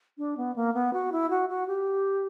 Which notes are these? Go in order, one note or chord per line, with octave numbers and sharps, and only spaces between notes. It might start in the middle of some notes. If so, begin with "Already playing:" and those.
D4
B3
A#3
B3
F#4
E4
F#4
F#4
G4